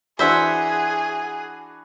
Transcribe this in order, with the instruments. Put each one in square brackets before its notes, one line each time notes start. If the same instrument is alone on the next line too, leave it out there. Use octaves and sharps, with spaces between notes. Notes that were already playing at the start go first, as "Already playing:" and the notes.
[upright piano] E3 D4 F#4 [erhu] G#4 [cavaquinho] C5 E5 F#5